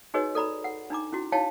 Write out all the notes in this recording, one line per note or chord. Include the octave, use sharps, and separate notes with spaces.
D#4 F#4 G#4 B4 C#5 D#5
A4 D5 A#5 B5
F#5
D4 D#4 A#5 D6
C#4 E4 F#4
D#4 E4 C#5 F5 G5 A5